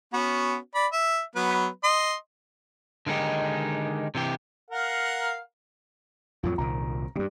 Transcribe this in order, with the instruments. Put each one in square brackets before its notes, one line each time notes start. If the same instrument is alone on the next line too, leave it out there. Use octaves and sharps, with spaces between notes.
[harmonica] B3 C#4 F#4
D5 B5
E5
F#3 B3 B4
D#5 C6
[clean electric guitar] D3 D#3 G#3 D#4 G4
C3 E3 G4
[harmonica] A#4 F5 F#5
[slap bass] F2 A2 F#3 [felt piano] F4
[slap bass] C2 A#2 D#3 [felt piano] A#5
[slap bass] G2 C#3 [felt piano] G3